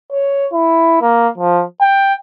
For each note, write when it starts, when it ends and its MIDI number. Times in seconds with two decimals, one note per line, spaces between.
0.12 0.47 73
0.52 0.97 64
1.02 1.29 58
1.38 1.64 53
1.81 2.15 79